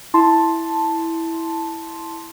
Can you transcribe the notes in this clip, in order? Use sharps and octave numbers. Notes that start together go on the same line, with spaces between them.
E4 A5 C6